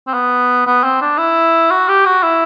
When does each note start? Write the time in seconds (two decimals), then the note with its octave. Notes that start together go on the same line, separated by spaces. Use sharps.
0.07 C4
0.14 B3
0.66 B3
0.84 C4
1.02 D4
1.18 E4
1.71 F#4
1.89 G4
2.06 F#4
2.24 E4